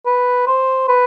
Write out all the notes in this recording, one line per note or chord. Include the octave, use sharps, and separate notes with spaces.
B4
C5
B4